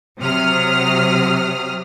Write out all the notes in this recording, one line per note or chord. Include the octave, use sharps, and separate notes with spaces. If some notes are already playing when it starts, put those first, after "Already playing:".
C3 F#3 D#6 F6